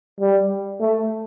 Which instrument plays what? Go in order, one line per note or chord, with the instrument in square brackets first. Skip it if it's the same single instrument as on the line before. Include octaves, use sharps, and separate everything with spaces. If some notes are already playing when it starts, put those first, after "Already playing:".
[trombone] G3
A3